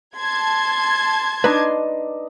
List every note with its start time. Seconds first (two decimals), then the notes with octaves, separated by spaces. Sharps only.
0.18 A5 C6 G#6
1.44 D4 D#4 B4 A#5